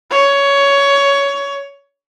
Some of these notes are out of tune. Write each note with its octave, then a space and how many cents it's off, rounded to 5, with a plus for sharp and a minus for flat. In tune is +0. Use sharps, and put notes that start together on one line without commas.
C#5 +15